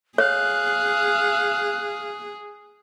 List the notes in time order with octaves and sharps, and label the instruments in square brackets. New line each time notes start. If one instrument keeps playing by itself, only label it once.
[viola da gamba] G#4 [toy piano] C#5 [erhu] F5 [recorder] F#6